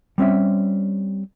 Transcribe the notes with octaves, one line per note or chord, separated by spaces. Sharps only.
G3 C4 C#4 E5